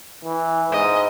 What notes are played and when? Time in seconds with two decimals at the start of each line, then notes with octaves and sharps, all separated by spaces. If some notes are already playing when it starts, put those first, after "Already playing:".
0.25 E3
0.72 G#2 D#5